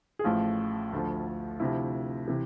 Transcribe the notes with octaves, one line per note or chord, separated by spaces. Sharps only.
G#4
A1 A2 F3 F4
D2 D3 F3
D2 C3 F3 E4
C3 E3